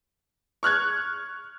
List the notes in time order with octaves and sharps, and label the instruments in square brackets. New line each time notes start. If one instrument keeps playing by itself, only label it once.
[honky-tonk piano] C#6 F6 F#6 G#6